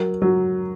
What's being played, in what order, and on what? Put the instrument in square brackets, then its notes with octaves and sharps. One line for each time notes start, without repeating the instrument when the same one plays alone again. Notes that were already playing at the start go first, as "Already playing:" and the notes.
Already playing: [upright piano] F#3 [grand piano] A#4
[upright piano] F#3